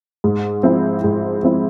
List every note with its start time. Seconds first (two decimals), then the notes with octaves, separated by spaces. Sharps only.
0.24 G#2
0.63 F3 C4 E4
1.04 G#2
1.43 F3 C4 E4